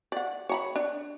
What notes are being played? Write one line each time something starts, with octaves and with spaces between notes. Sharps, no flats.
D5 F#5
C#5 A#5 B5
D4